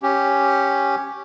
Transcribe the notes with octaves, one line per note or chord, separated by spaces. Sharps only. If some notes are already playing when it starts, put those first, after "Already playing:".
C#4 G4